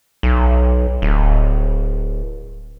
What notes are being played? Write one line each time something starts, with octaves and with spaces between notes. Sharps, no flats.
B1
D1